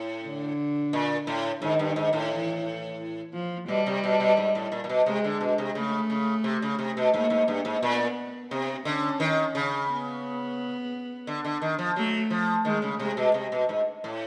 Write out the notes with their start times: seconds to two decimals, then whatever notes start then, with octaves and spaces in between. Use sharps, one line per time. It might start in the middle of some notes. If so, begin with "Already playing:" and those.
Already playing: A2
0.23 D3
0.93 A#2
1.27 A2
1.62 G#2 D#3
1.79 G2
1.96 G#2
2.13 A2
2.30 E3
3.33 F3
3.68 B2 G3
3.86 C3
4.04 B2
4.20 B2
4.37 G#2
4.55 A2
4.72 A#2
4.84 A#2
4.89 B2
5.06 C3 G#3
5.24 D3
5.41 B2
5.58 C3
5.75 C#3 A3
6.10 C#3
6.44 C3
6.62 C#3
6.79 C3
6.97 B2
7.14 G#2 A#3
7.30 G#2
7.48 G2
7.65 G#2
7.82 A#2 B3
8.51 C3 C4
8.85 D3 C#4
9.20 D#3
9.55 C#3
9.90 B3
11.27 D3
11.45 D3
11.62 D#3
11.79 F3
11.96 F#3 A3
12.30 F3
12.65 D#3 G#3
12.82 C#3
13.00 C3 G#3
13.17 B2
13.34 C3
13.52 B2
13.69 G#2
14.04 A2